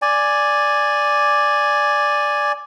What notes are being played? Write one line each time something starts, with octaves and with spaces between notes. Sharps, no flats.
D5 G#5